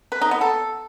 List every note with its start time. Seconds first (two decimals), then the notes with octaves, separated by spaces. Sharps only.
0.12 B4
0.21 D#4
0.31 B3
0.41 A4